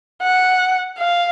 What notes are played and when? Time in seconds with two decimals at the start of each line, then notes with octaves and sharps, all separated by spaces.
0.22 F#5
0.98 F5